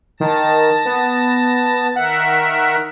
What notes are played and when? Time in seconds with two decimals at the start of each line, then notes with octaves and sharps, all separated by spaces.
0.20 D#3 A5 A#6
0.85 B3
1.96 D#3 A#4 E5 F#5